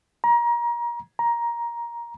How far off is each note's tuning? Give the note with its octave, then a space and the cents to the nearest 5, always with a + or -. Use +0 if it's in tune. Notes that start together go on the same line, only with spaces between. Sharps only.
A#5 +30
A#5 +15